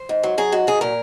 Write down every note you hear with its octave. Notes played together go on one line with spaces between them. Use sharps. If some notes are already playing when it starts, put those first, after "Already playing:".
Already playing: C5
G#2
F#3
F#3 G#4
G#2 F#4
F#3 G#4
A#2 A#4